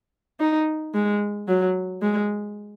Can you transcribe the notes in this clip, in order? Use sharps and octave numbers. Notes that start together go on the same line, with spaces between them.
D#4
G#3
F#3
G#3